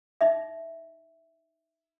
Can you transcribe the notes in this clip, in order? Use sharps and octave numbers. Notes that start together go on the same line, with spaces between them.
D#4 D#5 E5